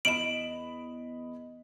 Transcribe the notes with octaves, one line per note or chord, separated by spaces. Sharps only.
E2 D#5 B5 D7 E7 F#7